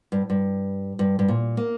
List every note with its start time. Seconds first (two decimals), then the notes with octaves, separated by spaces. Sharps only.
0.12 G2
0.30 G2
0.99 G2
1.19 G2
1.28 A#2
1.57 A#3